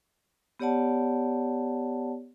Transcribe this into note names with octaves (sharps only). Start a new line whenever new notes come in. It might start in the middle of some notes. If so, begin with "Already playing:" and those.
B3 G4 C#5 D5 F#5 A5